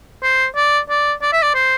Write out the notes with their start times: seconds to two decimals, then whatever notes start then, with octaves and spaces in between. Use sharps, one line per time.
0.23 C5
0.56 D5
0.90 D5
1.22 D5
1.32 E5
1.43 D5
1.55 C5